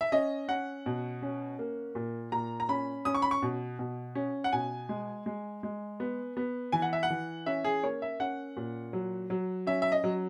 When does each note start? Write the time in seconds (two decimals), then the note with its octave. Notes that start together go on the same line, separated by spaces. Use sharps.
0.01 E5
0.12 C#4 D#5
0.48 C#4 F#5
0.86 B2
1.22 C#4
1.59 A#3
1.95 A#2
2.32 A#2 A#5
2.60 A#5
2.69 C#4 B5
3.05 C#4 D#6
3.15 C#6
3.22 B5
3.31 C#6
3.42 B2
3.79 B2
4.15 C#4
4.44 F#5
4.53 B2 G#5
4.89 G#3
5.26 G#3
5.63 G#3
6.00 B3
6.37 B3
6.72 E3 G#5
6.82 F#5
6.93 E5
7.03 F#5
7.10 E3
7.46 C#4 E5
7.64 G#4
7.83 A#3 C#5
8.02 E5
8.20 C#4 F#5
8.57 A#2
8.93 F#3
9.30 F#3
9.67 C#4 E5
9.82 E5
9.92 D#5
10.04 F#3